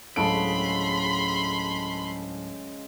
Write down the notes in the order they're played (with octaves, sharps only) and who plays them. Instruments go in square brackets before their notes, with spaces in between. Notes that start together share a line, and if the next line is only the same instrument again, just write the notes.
[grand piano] D1 A4 D7 [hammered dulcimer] C#3 G#3 [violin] B5 C6